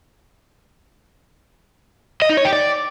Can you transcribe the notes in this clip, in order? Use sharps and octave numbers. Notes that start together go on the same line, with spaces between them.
D#5
D#4
C#5
G4
D5